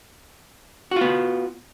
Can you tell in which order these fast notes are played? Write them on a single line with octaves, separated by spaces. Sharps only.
F#4 F4 B3